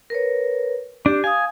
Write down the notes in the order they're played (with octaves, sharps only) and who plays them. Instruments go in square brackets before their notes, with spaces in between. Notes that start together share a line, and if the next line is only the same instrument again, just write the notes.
[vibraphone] A#4 B4 C#5
[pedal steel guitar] D4 [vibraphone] G4
[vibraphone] F5 D#6 [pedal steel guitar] G#5